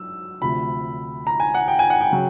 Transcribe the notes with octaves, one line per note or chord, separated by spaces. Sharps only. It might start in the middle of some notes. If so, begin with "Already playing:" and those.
Already playing: F#3 E6
D2 C3 F3 B5
A#5
G#5
F#5
G5
G#5
F#5
G5
C#3 F#3